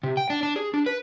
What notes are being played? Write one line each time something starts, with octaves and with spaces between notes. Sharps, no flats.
C3
G5
D4
D4
G#4
D4
B4